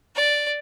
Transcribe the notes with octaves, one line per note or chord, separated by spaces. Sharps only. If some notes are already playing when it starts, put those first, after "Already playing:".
D5